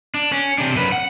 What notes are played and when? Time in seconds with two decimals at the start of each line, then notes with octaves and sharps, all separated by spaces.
0.14 D4
0.32 C#4
0.58 C3 D4
0.76 F#2 B4
0.92 F#5